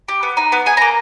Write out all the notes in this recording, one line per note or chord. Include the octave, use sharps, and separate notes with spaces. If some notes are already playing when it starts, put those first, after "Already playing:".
G4
B3
D#4
B3
G#4 G#5
A#3 A#5